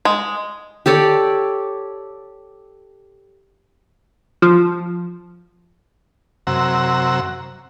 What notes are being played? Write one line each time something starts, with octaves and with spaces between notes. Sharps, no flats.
G#3
G4 A4 C#5 D5
F3
F#2 C3 F#5 A#5 E6